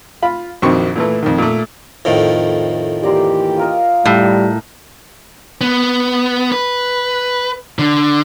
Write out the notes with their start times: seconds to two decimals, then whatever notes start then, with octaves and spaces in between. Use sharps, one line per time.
0.22 F4 B5
0.62 A#1 F2 D#3 F#3 C4 C#6
0.96 A#2 E3 A3
1.23 F2 D#3
1.38 A#2 A3
2.05 F2 A2 D#3
3.03 E3 A#3 G4 D5 A#5 C6
3.57 F4 A#4 D#5
4.05 A2 G3
5.61 B3
6.52 B4
7.79 D3